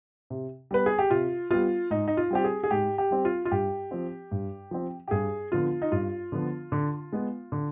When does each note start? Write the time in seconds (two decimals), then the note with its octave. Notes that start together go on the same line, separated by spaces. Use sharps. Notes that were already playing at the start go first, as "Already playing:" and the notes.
0.30 C3
0.71 G3 B3 B4
0.86 G#4
0.99 G4
1.10 C3 F4
1.51 G3 B3 F4
1.90 G#2 D#4
2.08 D#4
2.17 F4
2.31 G3 C4 G4
2.44 G#4
2.64 G#4
2.71 G#2 G4
2.98 G4
3.11 G3 C4
3.25 F4
3.45 F4
3.51 G2 G4
3.91 F3 C4
4.31 G2
4.71 F3 C4
5.08 G4
5.11 G2 G#4
5.52 D3 F3 B3 F4
5.82 D#4
5.92 G2 F4
6.32 D3 F3 B3
6.72 D3
7.13 G#3 B3
7.52 D3